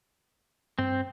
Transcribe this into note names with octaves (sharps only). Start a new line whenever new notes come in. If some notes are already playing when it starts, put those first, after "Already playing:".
G2 C4